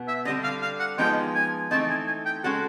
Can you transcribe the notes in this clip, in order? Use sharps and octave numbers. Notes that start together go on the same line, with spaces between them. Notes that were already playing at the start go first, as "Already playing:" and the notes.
Already playing: B2 B3
E5
D3 G3 C4 D#5
F5
F5
F#5
F3 G#3 B3 D#4 G5
G#5
E3 A3 C4 D#4 A5
G#5
G#5
G5
G#3 C#4 F#4 A4 F#5